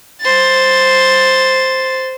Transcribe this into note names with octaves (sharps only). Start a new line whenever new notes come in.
C5 A6